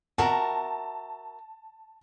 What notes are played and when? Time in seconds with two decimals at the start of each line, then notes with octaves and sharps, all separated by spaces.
0.18 F#4 A#4 E5 A5